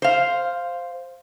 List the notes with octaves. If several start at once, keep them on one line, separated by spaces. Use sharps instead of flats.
C5 F5